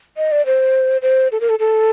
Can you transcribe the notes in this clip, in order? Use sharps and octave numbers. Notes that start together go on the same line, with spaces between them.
D#5
D5
C5
C5
A4
A#4
A4
A4